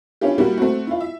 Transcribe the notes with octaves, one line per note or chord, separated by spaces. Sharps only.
C#4 D4 E4 F4 G4
G3 A#3 E4 F#4 G4
A3 C4 F#4
E4 F4
E5